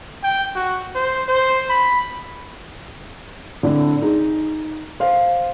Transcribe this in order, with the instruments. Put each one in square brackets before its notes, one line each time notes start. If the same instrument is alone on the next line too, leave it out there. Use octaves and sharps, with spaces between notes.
[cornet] G5
F#4
C5
C5
B5
[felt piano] A2 D3 C4 D4 E4
D#4 G#4
C5 F5